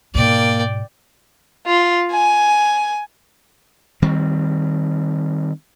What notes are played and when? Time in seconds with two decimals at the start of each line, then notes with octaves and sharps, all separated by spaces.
0.15 G#2 B2 A#3 D5 G5
1.66 F4
2.11 G#5
4.02 D#3 G3 C4